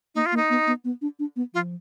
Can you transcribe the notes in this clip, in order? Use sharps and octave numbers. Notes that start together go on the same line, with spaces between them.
A#3 D#4
F4
A#3
D#4
B3
B3
B3
D4
D4
B3
F3 F4